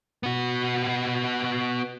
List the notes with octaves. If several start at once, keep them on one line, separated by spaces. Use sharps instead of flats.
B3 F#4